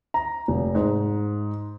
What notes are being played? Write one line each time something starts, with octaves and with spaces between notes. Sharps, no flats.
A#5
F1
G#2